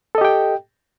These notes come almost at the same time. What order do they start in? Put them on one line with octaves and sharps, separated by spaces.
A4 D#5 G4 G5